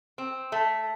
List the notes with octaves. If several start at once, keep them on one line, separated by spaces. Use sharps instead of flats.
C4
A3